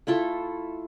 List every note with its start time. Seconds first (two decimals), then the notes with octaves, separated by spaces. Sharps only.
0.07 A3 E4 F4 A4